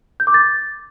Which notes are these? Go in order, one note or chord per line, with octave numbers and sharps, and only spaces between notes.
G6
D6
A6